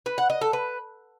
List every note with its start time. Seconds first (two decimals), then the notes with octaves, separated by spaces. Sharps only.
0.06 B4
0.18 F#5
0.30 D#5
0.41 A4
0.53 B4